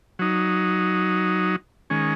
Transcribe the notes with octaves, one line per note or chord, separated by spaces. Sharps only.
F#3 D#4
D#3 G#3 C#4